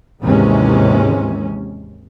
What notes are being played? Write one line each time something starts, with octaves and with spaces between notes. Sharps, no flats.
D#2 G#2 C3 E3 G#3 C#4